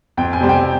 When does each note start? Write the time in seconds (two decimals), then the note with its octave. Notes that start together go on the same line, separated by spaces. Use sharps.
0.17 F2 G5
0.33 G#5
0.41 C3 G3 C4
0.49 G5